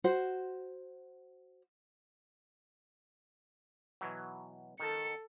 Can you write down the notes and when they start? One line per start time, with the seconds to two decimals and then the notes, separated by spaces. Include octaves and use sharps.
0.04 F#4 C5
4.01 B2 E3 F#3
4.80 D#3 A4 A5 C#7